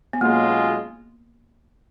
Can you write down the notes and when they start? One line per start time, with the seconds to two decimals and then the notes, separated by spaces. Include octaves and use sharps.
0.13 B3
0.21 B1 B2 G#3 A#3 C#4 F4